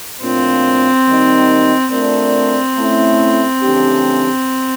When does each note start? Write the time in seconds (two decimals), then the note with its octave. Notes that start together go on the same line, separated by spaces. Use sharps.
0.22 A2 F3 A#3 C4 D4 F4
1.07 D#3 G3 A#3 D#4
1.92 A3 C4 D4 F4 A#4 D5
2.77 A3 C#4 E4
3.62 C#3 E3 A3 D4 G4